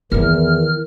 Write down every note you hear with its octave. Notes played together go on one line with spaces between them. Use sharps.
E2 D#3 E3 E4 F6